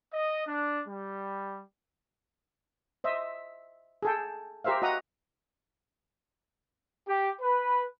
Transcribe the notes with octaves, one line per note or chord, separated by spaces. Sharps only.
D#5
D4
G3
C5 D#5 E5
G#4 A4 G5
G4 A#4 C5 E5 F5
F#4 D#5 F#5 A#5 D#6
G4
B4